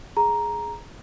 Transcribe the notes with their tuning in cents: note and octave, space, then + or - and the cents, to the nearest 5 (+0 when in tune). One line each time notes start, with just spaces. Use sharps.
G#4 +10 A#5 +5